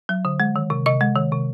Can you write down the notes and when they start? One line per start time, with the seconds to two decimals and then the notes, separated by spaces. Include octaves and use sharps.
0.09 F#3
0.25 D3
0.40 G#3
0.56 D#3
0.70 C3
0.86 C3 D#5
1.01 G#3
1.16 D#3
1.32 C3